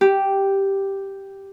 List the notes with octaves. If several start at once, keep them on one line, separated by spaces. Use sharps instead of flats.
G4